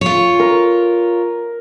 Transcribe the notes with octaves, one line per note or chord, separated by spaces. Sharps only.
F4 C#5
A#4